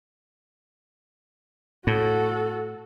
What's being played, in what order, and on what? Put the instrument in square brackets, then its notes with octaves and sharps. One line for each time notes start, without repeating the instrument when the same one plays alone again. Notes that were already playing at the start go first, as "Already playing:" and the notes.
[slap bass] A2 [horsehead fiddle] F#4 A4